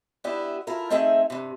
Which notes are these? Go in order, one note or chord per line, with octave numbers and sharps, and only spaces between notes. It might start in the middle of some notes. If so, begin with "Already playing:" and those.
B3 D4 E4 G4
E4 F4 A4 A#4
A3 C4 D#4 G#4 E5 G5
G2 C3